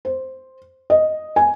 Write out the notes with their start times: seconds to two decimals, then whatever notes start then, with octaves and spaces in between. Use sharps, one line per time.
0.05 C5
0.90 D#5
1.36 G#5